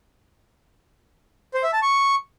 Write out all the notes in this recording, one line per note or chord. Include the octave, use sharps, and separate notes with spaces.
C5
E5
A5
C#6